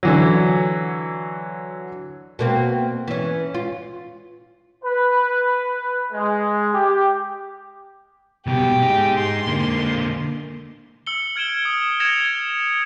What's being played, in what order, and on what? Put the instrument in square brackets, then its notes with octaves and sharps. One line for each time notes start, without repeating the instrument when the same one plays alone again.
[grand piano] D3 E3 F#3
[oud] B2 A#3 C4
E3 C#4
F4
[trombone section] B4
G#3
G4
[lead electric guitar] C2 B2 [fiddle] G4
[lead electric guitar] D#4 G#4
[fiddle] C6
[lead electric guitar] D3 A#3
[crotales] E6 C#7 G7
F6 G#6 D7 E7 G7
D#6
G#6 A#6 C#7 E7 F7